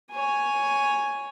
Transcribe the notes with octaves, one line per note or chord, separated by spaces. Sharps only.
C#5 G#5